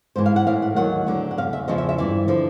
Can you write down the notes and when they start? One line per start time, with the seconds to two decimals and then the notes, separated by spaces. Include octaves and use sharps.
0.16 G#2 E3 C5
0.26 F5
0.36 F#5
0.46 A2 E3 F5
0.62 F#5
0.76 D#2 D#3 F#3 F#5
1.07 D2 D3 F#3
1.31 F#5
1.38 E2 C#3 F5
1.53 E5
1.68 E2 C#3 F3 D#5
1.78 E5
1.89 E5
1.98 G2 E3 D5
2.28 D3 F3